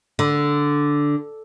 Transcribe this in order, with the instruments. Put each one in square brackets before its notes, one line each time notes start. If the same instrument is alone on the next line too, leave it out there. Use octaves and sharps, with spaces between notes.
[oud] D3